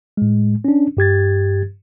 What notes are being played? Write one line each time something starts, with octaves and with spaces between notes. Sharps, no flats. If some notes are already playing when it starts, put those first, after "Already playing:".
A2 G#3
C#4 D4
G2 G4 G#6 A6